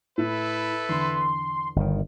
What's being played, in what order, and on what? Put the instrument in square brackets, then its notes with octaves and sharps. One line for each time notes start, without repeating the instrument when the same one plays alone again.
[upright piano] A2 [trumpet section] E4 A4 B4
[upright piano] E2 D3 [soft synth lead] C6
[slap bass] G1 D#3